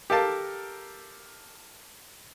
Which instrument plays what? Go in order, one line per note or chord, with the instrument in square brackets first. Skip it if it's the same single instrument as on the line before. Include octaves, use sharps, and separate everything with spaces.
[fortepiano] G4 A4 A#4 F5 A5